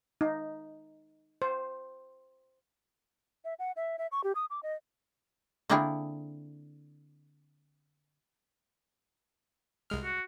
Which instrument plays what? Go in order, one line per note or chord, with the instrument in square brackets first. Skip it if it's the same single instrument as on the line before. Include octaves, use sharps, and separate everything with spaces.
[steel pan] D#4
C5
[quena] E5
F#5
E5
E5
C#6
G4
D#6
D6
D#5
[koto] D3 A#3 C4 D4 E4 G#4
[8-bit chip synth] C2 G#3 F6
[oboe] F#4